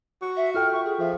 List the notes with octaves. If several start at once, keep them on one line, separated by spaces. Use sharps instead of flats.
F#4
E5
F4 A4 G5 F6
C#6
G#4
F3 E5